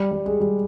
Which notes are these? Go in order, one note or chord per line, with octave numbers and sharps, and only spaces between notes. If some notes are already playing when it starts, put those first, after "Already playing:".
Already playing: G3
G3
G#3
G3